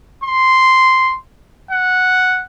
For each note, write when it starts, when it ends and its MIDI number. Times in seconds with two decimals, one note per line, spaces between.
0.24 1.14 84
1.71 2.45 78